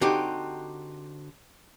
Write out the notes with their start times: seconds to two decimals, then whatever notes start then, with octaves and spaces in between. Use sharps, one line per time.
0.01 D3 C4 D#4 F#4 G4